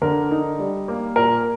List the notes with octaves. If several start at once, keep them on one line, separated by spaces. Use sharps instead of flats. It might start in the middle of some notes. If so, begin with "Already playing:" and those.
D3 A#4
D#4
G3
A#3
A#2 A#4